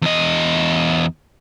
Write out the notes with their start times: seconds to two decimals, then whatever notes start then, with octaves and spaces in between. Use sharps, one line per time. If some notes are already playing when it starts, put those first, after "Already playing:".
0.02 E2 D#5